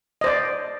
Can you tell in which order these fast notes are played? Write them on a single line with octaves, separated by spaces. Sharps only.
D#5 C5 D5